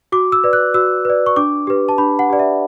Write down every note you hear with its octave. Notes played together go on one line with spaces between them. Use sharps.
F#4 D6
E6
B4 D5
F#6
F#4 E6
B4 D5
C#6
D4 D6
G4 B4
A5
D4 B5
F#5
G4 B4 D5
E5